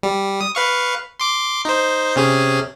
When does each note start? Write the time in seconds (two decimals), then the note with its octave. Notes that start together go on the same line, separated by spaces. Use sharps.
0.03 G3
0.41 D#6
0.55 B4 F5 C#6
1.20 C6 D6
1.65 D#4 C5
2.16 C3 C#4 G#4